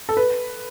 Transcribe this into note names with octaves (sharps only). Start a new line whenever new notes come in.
A4
B4